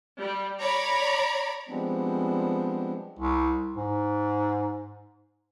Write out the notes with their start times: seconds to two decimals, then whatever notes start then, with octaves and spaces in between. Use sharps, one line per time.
0.19 G3
0.61 C#5 D5 A#5 B5
1.69 F3 G3 G#3 B3 C4 D4
3.19 C2
3.77 G#2